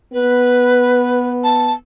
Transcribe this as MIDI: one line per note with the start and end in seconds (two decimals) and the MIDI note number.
0.13 1.75 59
0.13 1.30 71
1.44 1.73 81